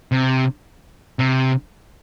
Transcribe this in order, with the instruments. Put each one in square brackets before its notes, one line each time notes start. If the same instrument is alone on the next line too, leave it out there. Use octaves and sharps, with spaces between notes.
[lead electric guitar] C3
C3